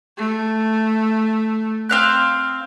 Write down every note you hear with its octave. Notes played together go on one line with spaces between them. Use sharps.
A3
C4 F5 F#6